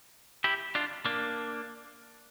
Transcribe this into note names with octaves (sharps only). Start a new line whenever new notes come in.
E4 G4
D4 F4
A#3 D4